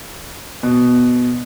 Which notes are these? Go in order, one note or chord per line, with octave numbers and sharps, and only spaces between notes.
B2